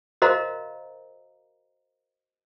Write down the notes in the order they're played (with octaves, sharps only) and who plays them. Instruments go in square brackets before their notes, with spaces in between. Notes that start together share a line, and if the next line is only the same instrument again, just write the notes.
[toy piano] F#4 A#4 C5 D#5 F5 A#5